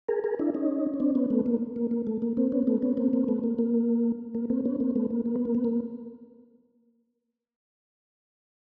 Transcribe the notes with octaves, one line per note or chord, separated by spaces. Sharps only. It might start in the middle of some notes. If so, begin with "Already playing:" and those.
G#4 A#4
G#4 A#4
D4 E4
C#4 D#4
C#4
C4 D4
B3 C#4
A3 B3
A#3
A#3
A#3
A3
A#3
A#3 C4
B3 C#4
A3 B3
B3 C#4
A#3 C4
A#3 C4
A3 B3
A#3
A#3
A#3
A#3 C4
B3 C#4
A#3 C4
A3 B3
A#3
A#3
B3
A#3
B3
A#3